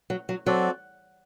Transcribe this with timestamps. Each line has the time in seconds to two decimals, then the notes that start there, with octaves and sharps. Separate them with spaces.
0.10 F#3
0.29 F#3
0.46 F#3 C4 F#4 A4 D5